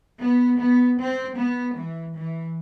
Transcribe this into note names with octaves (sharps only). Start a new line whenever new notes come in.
B3
B3
C4
B3
E3
E3